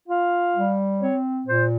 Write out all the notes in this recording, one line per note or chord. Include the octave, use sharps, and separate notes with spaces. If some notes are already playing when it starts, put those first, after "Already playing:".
F4 F5
G3
C4 C#5
A#2 C5